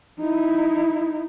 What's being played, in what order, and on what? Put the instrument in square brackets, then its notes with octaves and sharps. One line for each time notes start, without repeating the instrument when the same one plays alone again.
[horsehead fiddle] D#4 E4